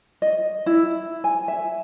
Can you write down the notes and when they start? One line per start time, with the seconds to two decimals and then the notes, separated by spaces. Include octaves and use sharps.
0.22 D#5
0.66 E4
1.24 G#5
1.48 E5